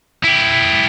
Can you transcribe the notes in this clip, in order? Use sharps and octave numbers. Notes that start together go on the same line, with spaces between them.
E4 G4